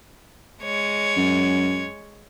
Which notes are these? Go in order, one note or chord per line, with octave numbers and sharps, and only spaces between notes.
G#3 C#5
F#2